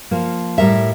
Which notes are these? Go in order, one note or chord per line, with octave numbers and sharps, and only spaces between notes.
F3 A#3
A2 G3 A#4 E5